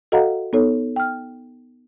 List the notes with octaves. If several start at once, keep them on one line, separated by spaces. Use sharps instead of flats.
F#4 A4 D#5 F5 F#5 A#5
B3 D#4 A4 C#5
G5 F6